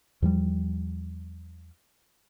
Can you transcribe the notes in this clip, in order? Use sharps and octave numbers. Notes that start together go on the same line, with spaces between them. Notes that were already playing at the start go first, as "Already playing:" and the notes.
E2 F3 G3